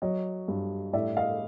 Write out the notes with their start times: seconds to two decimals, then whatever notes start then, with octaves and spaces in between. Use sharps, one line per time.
0.02 F#3 C#5 D#5
0.48 G2
0.93 A2 D5 E5
1.17 D#5 F5